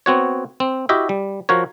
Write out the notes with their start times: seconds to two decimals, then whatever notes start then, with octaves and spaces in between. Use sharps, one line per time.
0.06 B3 C4 F#4 C#5
0.60 C4
0.89 E4 F#4 G4 D#5 E5
1.09 G3
1.49 F3 F#4 A#4 C#5